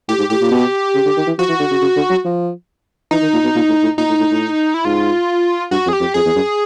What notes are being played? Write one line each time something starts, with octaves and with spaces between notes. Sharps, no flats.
A2 G4
G#2
A2 G4
A#2
B2
C#3
D3
D#3
E3
F3 F#4
E3
D3
C#3
C#3
D3
F#3
F3
E3 D#4
D#3
A#2
B2
A#2
A2
A2
A#2 D#4
A2
A2
A2
E4
G#2 F4
G2 F#4
F2
G#4
G4
F2
F2 G#4
E2
F#2